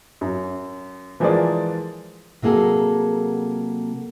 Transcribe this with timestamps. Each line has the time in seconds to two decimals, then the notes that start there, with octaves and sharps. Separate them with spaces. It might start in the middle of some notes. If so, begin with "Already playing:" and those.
0.21 F#2
1.20 E3 F3 G#3 G#4 A#4 D5
2.42 C3 F#3 A#3 G#4 A4